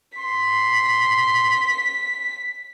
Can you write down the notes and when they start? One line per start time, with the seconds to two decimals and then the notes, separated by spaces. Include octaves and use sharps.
0.18 C6 B6